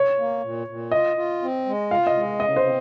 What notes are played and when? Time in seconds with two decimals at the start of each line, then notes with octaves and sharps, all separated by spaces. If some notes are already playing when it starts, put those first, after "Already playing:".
Already playing: C#5
0.18 A#3
0.43 A#2
0.67 A#2
0.91 F4 D#5
1.16 F4
1.42 C4
1.66 G#3
1.91 F4 F5
2.07 D#5
2.16 G#3
2.40 C#3 D#5
2.56 C5
2.65 C4